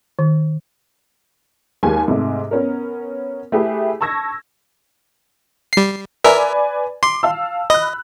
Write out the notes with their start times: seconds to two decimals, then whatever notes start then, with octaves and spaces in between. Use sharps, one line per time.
0.19 D#3
1.83 D#2 G#3 G4 G#5
2.08 G#2 C3 A3
2.51 B3 C#4 A#4
3.52 A3 E4 G4 G#4 B4
4.01 A5 C#6 E6 G#6 A#6
5.73 G3 C7
6.24 A#4 B4 D5 E5 G#5
7.03 C6 D6
7.23 F5 A5 E6
7.70 D#5 B5 F#6